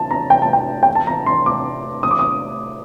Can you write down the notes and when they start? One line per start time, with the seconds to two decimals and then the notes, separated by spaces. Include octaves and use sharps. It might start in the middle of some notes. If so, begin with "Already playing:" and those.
Already playing: A5
0.11 A#5
0.30 G5
0.42 A5
0.53 G5
0.83 G5
0.95 A5
1.07 A#5
1.26 C6
1.46 D6
2.03 D#6
2.11 D6
2.19 D#6